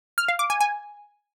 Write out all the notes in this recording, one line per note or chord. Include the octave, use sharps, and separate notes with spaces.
F6
F5
D6
G#5
G#5